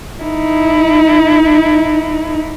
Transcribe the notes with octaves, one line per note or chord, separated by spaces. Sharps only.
D#4 E4